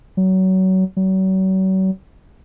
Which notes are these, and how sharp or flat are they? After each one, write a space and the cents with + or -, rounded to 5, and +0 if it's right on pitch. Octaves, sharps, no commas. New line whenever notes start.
F#3 +25
F#3 +40